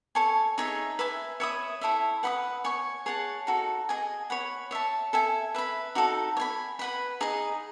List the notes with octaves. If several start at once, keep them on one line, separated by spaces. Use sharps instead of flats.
A4 C#5 G#5 C#6
D#4 G#4 C#5 E5
B4 E5 G#5
C#5 E5 B5 D#6
E4 A4 C#5 E5
B4 F#5 B5 D#6
C#5 G#5 C#6
G#4 C#5 F#5 A5
D#4 F#4 A4
G#4 D#5 G#5
C#5 F#5 B5
C#5 E5 A5
A4 E5 G#5
B4 E5 B5
D#4 F#4 A4
C#5
G#5 B5
B4 F#5 B5
D#4 G#4 D#5